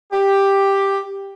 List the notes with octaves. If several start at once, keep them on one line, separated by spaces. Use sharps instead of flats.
G4